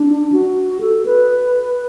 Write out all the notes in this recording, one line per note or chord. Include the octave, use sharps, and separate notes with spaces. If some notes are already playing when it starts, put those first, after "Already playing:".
Already playing: D4
F#4
A4
B4